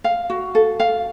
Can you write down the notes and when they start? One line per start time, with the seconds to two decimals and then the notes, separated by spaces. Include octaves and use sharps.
0.04 F5
0.30 F#4
0.55 A4
0.80 F5